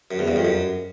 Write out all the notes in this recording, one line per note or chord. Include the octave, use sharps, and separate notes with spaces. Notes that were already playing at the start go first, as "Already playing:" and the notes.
F#2
E2
G2
F2
F#2